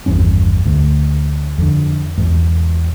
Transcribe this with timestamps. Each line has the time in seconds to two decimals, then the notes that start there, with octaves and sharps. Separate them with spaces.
0.06 G#1 E2 G2 C#4
0.66 D2
1.58 F2 D3
2.18 E2 G#2